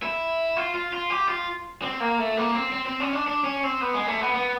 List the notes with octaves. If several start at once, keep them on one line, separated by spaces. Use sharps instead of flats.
E4
F4
F4
F4
G4
F4
C4
A#3
A3
A#3
C4
C4
C4
C#4
D4
D4
C#4
C4
B3
G#3
A3
B3
B3